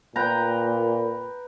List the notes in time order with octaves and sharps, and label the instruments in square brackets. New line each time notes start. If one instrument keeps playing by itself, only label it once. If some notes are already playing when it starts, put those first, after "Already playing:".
[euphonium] A#2 [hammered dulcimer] B4 G5 A#5